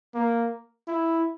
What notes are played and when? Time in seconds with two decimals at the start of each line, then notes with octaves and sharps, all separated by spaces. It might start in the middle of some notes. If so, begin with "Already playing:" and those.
0.15 A#3
0.88 E4